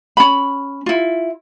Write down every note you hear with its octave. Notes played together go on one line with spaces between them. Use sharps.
C#4 B5
E4 F4